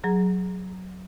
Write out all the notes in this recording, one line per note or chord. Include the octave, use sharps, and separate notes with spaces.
F#3 G#4 A#5